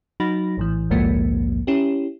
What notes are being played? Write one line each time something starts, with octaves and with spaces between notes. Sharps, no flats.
F#3 D#4 F#4 B5 A#6
A#1 A2 E3
A#1 D#2 G#2 F3 G#3 A#3
C#4 E4 G4